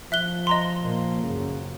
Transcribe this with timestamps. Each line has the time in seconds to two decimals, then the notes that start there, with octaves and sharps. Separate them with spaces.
0.12 F3 E5 F#6 G7
0.47 D#5 A#5 C6
0.81 A#2 A#3
1.23 F#2 C#3